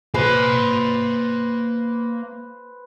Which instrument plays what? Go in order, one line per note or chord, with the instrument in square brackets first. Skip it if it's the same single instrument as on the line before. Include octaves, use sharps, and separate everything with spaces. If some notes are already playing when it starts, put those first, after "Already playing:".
[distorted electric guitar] A#3 G#5 [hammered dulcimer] B4 C5 C6